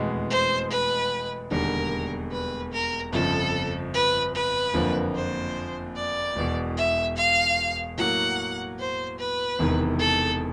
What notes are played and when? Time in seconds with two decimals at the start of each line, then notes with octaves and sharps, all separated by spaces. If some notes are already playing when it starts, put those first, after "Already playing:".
Already playing: F1 E2 B2 G#3 B3
0.30 C5
0.70 B4
1.51 E1 D#2 D3 G3 A#4
2.32 B4
2.72 A#4
3.12 G1 F2 C#3 F3 A4
3.94 B4
4.34 B4
4.74 F#1 F2 D3 F3 A#3
5.15 C5
5.96 D5
6.36 E1 E2 B2
6.77 E5
7.17 F5
7.98 A2 F#3 A#3 F#5
8.79 C5
9.18 B4
9.59 E1 E2 C3 D#3
9.99 A4